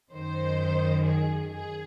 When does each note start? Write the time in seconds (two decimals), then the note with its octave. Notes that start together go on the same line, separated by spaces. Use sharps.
0.12 F#2 D#3 C5
1.06 G#4
1.52 G#4